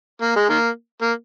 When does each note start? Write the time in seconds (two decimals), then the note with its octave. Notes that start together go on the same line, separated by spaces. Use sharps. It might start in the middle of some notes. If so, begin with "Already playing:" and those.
0.22 A#3
0.36 G#3
0.49 D#3 A#3
1.02 A#3